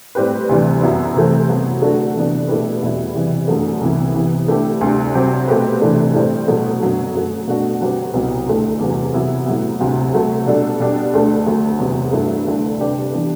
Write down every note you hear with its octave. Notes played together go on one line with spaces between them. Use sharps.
A2 G3 C4 G4 B4
D2 C3 E3 G3
F#2 F#3 B3 E4
C3 E3 A3 C4
C3 F#3 B3 F#4
D3 A3 D4 F#4 A4
C3 E3 B3 D4
B2 A3 E4 G4 B4
E2 B2 G3 B3 E4
C3 E3 G3
F#2 D3 F#3 A3
C2 C3 E3 B3 E4
C3 E3 B3
D3 A3 E4 G4
D2 C3 G3 D4
C3 F#3 C4 G4
B2 A3 C4 G4 B4
C3 E3 A3 D4
A2 G3 C4
B2 F#3 A3
F#2 D3 F#3 B3
F#2 F#3 A3
B2 A3 D4 F#4
D3 F#3 C4 G4 B4
C2 B2 F#3 B3
D2 D3 A3
E2 C3 F#3
C3 F#3 B3 E4
A2 F#3 B3
D2 C3 F#3
C3 F#3 A3
B2 G3 D4 A4
B2 G3 D4 G4
D2 D3 A3 D4
D2 D3 F#3 A3
E2 C3 F#3 B3
G2 F#3 A3 E4
D2 D3 A3 D4
C3 G3 D4 G4 B4
E3 G3 B3 D4